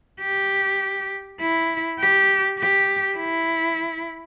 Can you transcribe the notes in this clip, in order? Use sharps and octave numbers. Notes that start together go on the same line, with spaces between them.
G4
E4
G4
G4
E4